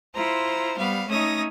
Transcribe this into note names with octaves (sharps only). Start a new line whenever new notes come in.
E4 F4 C5 A#5
G3 B3 F5
A3 C#4 D#4 C#5 D#6 A#6